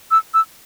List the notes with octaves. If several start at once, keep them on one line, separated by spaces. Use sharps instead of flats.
E6
E6